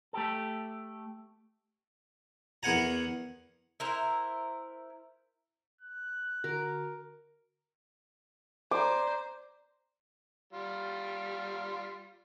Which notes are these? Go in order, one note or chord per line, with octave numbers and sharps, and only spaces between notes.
A3 G4 A4
E2 B3 A#4 F#5 G#5 A#5
E4 A#4 C5
F#6
D3 F#4 A#4
C5 D5 A#5 D6
G3 F4